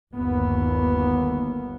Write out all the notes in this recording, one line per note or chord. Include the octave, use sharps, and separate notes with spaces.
G1 D#2 B3